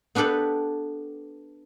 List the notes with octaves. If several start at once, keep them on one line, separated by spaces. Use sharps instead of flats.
B3 D4 G4 A4 B4